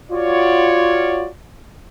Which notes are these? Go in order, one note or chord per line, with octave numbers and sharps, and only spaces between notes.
F4 F#4 C#5 D5